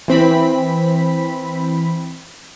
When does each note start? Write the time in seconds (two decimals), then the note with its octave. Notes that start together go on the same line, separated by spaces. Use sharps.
0.08 E3 C4 B5 B6